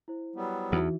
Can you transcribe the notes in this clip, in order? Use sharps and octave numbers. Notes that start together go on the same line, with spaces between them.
E4 C5
F#3 G3 B3
E2 E3 D#4 F#4